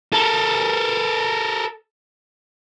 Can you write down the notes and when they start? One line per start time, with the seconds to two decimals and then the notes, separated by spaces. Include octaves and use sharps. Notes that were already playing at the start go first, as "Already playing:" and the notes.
0.13 A4 A#4